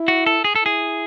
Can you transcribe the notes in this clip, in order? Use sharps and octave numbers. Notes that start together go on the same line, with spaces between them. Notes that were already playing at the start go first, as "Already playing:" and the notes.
Already playing: E4
F#4
A4
G#4
A4
E4 G#4